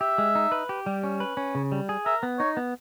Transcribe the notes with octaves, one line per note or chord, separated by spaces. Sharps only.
G4 E5
G#3
D#4
B4
G4
G3
C#4
B4
C#4
C#3
G3
G#4
A#4 E5
B3
D#4 C#5
B3